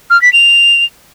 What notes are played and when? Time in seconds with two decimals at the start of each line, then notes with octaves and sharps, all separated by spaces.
0.10 F6
0.22 B6
0.33 F7